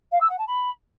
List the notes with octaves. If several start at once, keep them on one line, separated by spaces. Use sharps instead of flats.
F5
E6
F#5
A5
B5